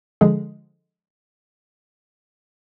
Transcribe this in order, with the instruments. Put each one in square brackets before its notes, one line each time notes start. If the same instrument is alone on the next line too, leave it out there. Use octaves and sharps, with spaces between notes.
[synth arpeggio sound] D3 F3 G#3 G#4